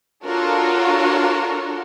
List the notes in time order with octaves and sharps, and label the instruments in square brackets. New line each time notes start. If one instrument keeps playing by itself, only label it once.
[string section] D4 F4 F#4 A4 A#4 C#5